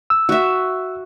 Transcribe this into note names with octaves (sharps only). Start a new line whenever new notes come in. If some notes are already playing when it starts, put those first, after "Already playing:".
E6
F#4 E5